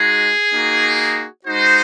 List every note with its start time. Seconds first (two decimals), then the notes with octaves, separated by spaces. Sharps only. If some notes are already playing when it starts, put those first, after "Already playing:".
Already playing: G#3 D#4 F#4 G#4
0.53 A#3 D#4 F#4
1.45 G#3 D#4 F#4 C5